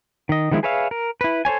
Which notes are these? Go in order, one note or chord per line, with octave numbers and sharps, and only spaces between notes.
D#3 D#5
D#3 F3 G#3 D#4 E4
G#4 B4 C#5 E5 F5
A#4
E4 B4
A4 C5 C#5 G#5